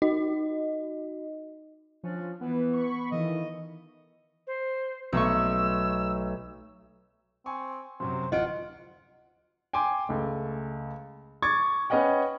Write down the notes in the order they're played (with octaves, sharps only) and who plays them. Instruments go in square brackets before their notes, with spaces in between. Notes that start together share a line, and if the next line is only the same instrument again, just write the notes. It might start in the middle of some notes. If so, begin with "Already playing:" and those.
[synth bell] D#4 F#4 D#5
[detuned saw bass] F3 [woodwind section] C#4 D4
[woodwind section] E3 [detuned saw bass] B3 [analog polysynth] B4
[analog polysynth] B5 C#6
[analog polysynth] D#3 E3 [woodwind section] F4 A4 D#5
[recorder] C5
[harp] B1 A3 C#6 [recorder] E6
[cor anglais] C4 [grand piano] G#5 C#6
[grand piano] F#2 C3 F#3 [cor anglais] C5
[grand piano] D1 F4 D7 [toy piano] D#5 [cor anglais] F#5
[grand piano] G5 G#5 C6 D6
C#2 A3
C#6 D6 G#6 A6
C#4 B4 D#5 F#5 G5